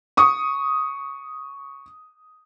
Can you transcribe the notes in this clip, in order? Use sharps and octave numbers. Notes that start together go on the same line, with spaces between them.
C#6 D#6